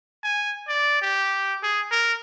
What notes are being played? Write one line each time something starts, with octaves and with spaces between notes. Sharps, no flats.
G#5
D5
G4
G#4
A#4